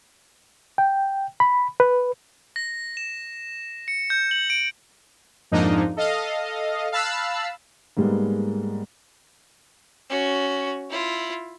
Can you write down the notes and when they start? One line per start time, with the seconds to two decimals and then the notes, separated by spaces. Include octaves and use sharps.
0.78 G5
1.40 B5
1.80 B4
2.56 A#6
2.97 E7
3.88 C#7
4.10 G6
4.31 F#7
4.50 D7
5.51 F2 G#2 F3 A#3 D4 D#4
5.96 A4 D#5 F5
6.92 F5 A5 B5 E6 F#6
7.97 G#2 G3 G#3 A#3 B3
10.10 C#4 F#4
10.90 E4 F4